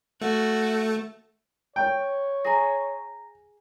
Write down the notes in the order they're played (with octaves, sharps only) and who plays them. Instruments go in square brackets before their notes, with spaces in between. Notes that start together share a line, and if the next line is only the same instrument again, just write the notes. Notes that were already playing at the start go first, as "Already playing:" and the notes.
[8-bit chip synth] A3 [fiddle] F#4
[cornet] C#5 [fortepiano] G5
[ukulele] G#4 G#5 [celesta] A#5 A#6